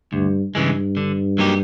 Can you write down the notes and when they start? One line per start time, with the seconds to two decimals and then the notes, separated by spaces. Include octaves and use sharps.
0.13 D2 G2
0.55 G2 C#3 E3 G#3
0.97 D3
1.38 F#3 A#3 D#4 G4